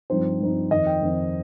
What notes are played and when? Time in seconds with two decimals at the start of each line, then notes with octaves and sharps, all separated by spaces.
0.10 G2 F3 C4 D#4 C5
0.40 G2 F3 C4 D#4
0.71 F2 D#3 C4 D#5
0.87 G5
1.01 F2 D#3 C4